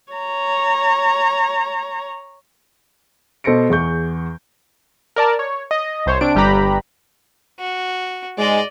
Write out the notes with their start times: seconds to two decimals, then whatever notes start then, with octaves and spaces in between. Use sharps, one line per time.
0.13 C#5 A#5
3.44 B2 A4 C5 A#6 C#7 D7
3.70 E2 G#4 C#6 G6
5.16 A#4 D5 A5
5.39 C#5
5.71 D#5
6.06 C2 C5 C#5
6.21 C3 D4 D7
6.35 G1 G3 G4 B4 A#5 B5
7.59 F#4
8.39 G#2 G#3 D5 D#5